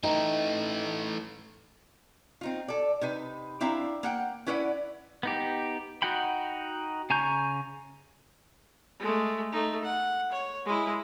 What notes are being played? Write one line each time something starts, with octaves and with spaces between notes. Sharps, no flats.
E3 A3 D#4 D#5 G5
C4 D#4 F4
A4 D5
C3 D#4 B4
C4 D4 E4 E5 F5 A#5
A#3 F#5 G5
C#4 E4 B4 D5 E5 F#5
B3 D#4 G4
D#4 F#4 F#5 G5 B5
C#3 G#5 A#5 C#6 G6
G#3 A3
A3 D#4
F#5
C#5
G#3 E4